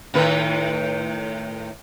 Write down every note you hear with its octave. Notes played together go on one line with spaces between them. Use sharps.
A2 D#3 B4